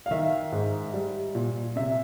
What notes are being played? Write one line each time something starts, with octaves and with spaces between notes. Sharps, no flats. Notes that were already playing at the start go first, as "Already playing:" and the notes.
F5
D#3 E5
G#2
G3
A#2
C3 E5